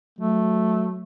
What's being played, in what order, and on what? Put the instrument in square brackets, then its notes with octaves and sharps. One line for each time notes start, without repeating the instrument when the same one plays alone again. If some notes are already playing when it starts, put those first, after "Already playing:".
[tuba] F#3 [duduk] A3